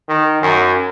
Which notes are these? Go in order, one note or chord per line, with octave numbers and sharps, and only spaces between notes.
D#3
F#2